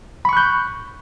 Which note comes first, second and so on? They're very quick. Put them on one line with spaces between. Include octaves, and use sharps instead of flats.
B5 C#6 F#6 G6